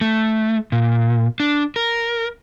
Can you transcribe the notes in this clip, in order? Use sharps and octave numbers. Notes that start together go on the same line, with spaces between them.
A3
A#2
D4
A#4